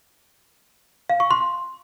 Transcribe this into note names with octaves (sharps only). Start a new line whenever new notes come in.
F5
C#6
C6